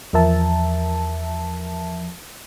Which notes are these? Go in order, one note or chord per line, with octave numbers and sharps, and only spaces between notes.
E2 F3 A#4 E5 A5